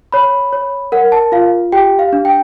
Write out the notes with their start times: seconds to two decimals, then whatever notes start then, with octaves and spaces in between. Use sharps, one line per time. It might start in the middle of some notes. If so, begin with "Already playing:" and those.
0.12 C#5 B5
0.52 C#5
0.92 A#4 F#5
1.12 A5
1.32 F4 F5
1.72 G4 G5
1.99 F5
2.13 D4
2.25 G5